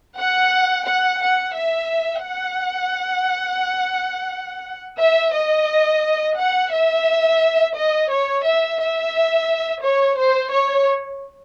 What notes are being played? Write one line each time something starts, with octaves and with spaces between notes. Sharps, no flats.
F#5
F#5
F#5
E5
F#5
E5
D#5
F#5
E5
D#5
C#5
E5
E5
C#5
C5
C#5